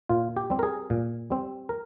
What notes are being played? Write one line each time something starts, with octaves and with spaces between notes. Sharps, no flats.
A#2 F4
G4
G3 C4
A#4
G#4
A#2
G3 C4
A#4